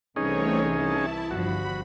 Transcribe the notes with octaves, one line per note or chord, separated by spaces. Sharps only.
C2 E3 A3 C4 C#4 D#4 G#4 C#5
E4 A5
G1 F3 F#4 B5